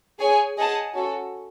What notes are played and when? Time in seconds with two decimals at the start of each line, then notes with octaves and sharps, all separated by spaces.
0.19 G#4 C#5 G#5
0.57 G#4 D#5 F#5 A5
0.94 C#4 F#4 A4